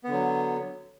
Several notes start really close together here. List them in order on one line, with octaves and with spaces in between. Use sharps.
B3 D3 F#3